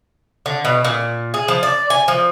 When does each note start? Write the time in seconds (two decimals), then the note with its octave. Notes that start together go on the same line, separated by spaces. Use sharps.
0.46 D3
0.65 B2
0.85 A#2
1.34 G#4
1.48 F3
1.63 D5
1.90 G#5
2.08 F3